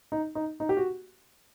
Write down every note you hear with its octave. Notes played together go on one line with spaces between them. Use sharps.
D#4
D#4
D#4
G4
F#4